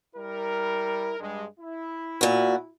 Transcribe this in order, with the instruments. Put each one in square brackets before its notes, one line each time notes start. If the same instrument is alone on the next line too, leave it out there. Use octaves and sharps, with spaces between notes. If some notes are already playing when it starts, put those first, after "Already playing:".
[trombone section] G3 E4 A#4
G2 G#3
E4
[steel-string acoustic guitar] A#2 F#4